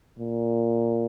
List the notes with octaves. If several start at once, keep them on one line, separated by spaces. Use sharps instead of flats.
A#2